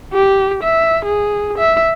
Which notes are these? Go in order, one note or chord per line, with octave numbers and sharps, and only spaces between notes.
G4
E5
G#4
E5